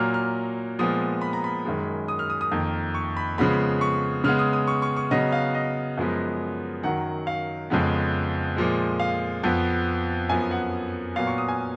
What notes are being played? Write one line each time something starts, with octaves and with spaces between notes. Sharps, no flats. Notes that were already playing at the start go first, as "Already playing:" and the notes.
Already playing: A#2 F#3 A#3 F6
F6
A#2 F3 G#3 B3 D#6
B5
A#5
B5
F#2 D#3 G#3
D#6
F6
D#6
D#6
F2 D#3 A#3
C#6
B5
C#3 F3 G#3 B3 B5
C#6
C#3 G#3 B3 F6
D#6
D#6
C#6
C#6
C#6
C#3 F#3 B3 D#5
F5
D#5
F#2 F3 G#3 B3
F#2 D#3 F#3 F#5
F5
F2 C#3 F3 G#3 B3
A#2 F3 G#3
F5
F2 F3 B3
F#2 F3 B3 G#5
F#5
A#2 F#3 B3 F5
C#6
D#6
G#5